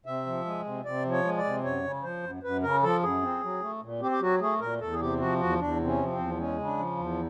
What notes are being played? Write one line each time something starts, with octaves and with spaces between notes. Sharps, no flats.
C3 E5
F3
G#3
C3
C3 D5
F3
C#5
G#3
D5
C3
F#2 C#5
C#3
F3 C5
F#2
F#2 B4
C#3 A#4
F3 A4
F#2 G#4
C4
F#3
A3
A#2
C4 G4
G4
F#3 F#4
A3 G#4
A#2 A#4
E2 A4
G#4
C3 G4
F3 F#4
E2 F#4
E2 D4
C3
C#4
F3
C4
E2
G#3 C#4
C#3
D4
F3
E2